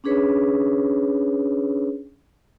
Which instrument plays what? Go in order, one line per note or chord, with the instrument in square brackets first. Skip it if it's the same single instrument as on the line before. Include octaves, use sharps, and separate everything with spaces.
[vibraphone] C#4 D4 G#4 B4 C#5